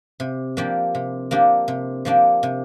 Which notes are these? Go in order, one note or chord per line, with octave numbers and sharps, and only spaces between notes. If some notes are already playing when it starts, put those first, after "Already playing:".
C3
F3 A#3 D4 G4
C3
F3 A#3 D4 G4
C3
F3 A#3 D4 G4
C3